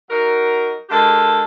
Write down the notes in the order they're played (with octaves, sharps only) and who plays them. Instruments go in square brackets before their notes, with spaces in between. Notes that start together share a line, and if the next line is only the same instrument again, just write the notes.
[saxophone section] F#3 D#4 F#4 A#4
D3 G#3 A#3 G4 A4